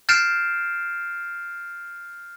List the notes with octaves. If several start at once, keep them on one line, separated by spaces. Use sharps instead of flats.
F6 G6 A6 C7 D7 E7